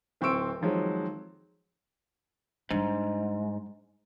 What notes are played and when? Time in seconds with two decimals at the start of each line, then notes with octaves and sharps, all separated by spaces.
0.21 D1 C4 C5 C#6 E6 D7
0.60 F2 D#3 F3 F#3 G#3
2.70 G#2 G3 D4